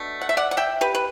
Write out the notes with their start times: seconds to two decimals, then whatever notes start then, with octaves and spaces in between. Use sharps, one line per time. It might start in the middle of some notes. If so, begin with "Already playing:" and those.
Already playing: B2 A3 D4
0.21 F#5
0.29 E5
0.37 D5 F#5
0.51 F#5
0.57 E5 G5
0.81 G4 B4
0.95 B4